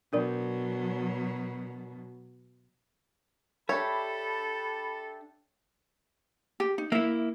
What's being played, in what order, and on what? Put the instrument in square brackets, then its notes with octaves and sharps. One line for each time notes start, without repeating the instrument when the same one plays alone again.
[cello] B2 F#3 [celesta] D4 A#4 D5
[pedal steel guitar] D4 G4 E5 [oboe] A4 [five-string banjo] C#5 [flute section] B5
[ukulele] G4
D#4
[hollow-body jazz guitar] A#3 E4 [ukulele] E5